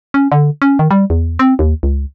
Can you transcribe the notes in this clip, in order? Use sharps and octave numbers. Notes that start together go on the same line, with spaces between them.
C#4
D3
C#4
D#3
G3
E2
C4
D#2
C#2